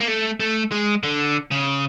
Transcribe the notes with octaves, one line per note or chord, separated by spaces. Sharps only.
A#3
A3
A3
G#3
D3
C#3